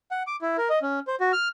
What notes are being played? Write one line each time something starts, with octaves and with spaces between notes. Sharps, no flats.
F#5
D6
E4
A#4
D#5
C#4
C5
F#4
F6